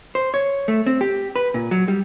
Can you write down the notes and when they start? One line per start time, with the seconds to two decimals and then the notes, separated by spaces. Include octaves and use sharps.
0.15 C5
0.34 C#5
0.68 A3
0.86 C4
1.01 G4
1.36 B4
1.54 A#2
1.71 F#3
1.88 G3